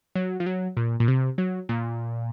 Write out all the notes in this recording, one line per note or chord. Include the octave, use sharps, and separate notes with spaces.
F#3
F3
F#3
A#2
A#2
C3
F#3
A#2